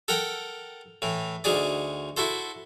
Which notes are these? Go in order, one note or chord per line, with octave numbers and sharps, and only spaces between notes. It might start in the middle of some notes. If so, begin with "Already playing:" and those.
A4 A#4 F#5 G5 A#5
A2 E3
D2 D#4 F#4 G#4 D5
E4 F#4 A4 C5